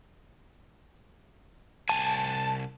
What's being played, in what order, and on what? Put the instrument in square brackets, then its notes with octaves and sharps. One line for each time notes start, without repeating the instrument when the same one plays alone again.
[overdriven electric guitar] C2 G#5 [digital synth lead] A5